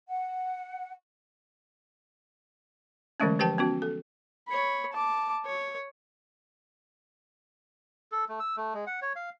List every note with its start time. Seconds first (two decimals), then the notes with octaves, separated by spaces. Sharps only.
0.09 F#5
3.20 D3 E3 F#3 G#3 A3 C#4
3.39 F3 G4 B4 G5 A5
3.58 B3 C#4 F#4
3.82 A4
4.48 C#5 B5
4.93 A5 D6
5.46 C#5
8.12 A4
8.29 A3
8.40 E6
8.57 A3
8.74 G#3
8.87 F#5
9.02 C#5
9.16 F5